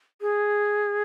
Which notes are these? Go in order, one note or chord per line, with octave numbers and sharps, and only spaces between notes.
G#4